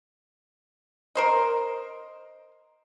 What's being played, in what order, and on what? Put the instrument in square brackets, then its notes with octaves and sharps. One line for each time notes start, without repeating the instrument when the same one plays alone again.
[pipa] A#4 C5 D#5